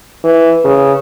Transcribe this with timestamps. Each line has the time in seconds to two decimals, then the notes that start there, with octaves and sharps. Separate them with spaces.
0.24 E3
0.64 C#3